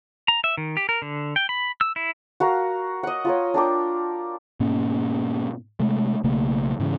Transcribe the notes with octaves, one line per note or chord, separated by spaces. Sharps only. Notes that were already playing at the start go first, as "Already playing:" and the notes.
A#5
E5
D#3
G4
A#4
D3
G5
B5
E6
E4
F#4 A#4 F5
D#5 F#5
F4 A#4 C#5
D4 A#4 G5 D6
G#2 B2 A#3 C#4
C3 G#3 A3
B1 C#3 A3 A#3
G#2 C#3 E3